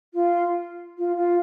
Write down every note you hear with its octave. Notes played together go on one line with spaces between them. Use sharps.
F4
F4
F4